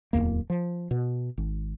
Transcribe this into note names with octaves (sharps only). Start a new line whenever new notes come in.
D1 G1 E2 A#3
F3
B2
G#1